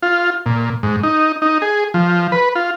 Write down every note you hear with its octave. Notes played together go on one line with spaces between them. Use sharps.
F4
A#2
G#2
D#4
D#4
G#4
F3
B4
F4